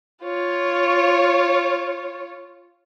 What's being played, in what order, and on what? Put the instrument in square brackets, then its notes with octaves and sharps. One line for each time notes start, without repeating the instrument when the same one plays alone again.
[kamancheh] F4 C#5